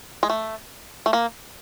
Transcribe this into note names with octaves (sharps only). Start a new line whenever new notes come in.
G#3
A3
A3
A#3